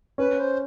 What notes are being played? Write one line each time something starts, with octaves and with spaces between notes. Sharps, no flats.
C#4 B4
C5